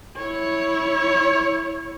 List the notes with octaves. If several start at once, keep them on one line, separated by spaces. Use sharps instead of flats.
E4 C#5